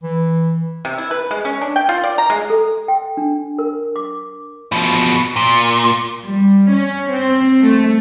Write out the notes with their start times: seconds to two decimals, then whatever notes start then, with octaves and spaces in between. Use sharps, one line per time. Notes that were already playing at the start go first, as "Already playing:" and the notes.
0.03 E3
0.85 C3
0.98 E4
1.11 B4
1.31 G#3
1.45 C#4
1.61 D4
1.76 G5
1.89 F4
2.04 D5
2.18 A#5
2.30 G#3
2.50 A4
2.88 G5
3.17 D4
3.59 A#4
3.96 D6
4.72 B2 F3
5.36 A#2
6.25 G3
6.72 C#4
7.12 C4
7.62 A3